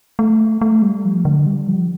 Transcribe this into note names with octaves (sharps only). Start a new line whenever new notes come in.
A3
A3
G3
F3
D3
G3
F3